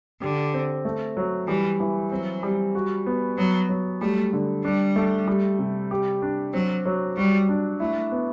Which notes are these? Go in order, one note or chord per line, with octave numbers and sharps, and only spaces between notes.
D3 G4
C4
A3
F#3
E3 G3
E3
F#3 C4
G3
F#4
B3
F#3 B3
F#3
G3 A3
D3
G3 D4
A3
G3
C3
G4
D4
F#3 C4
F#3
G3 F#4
D4
A3 E4
B3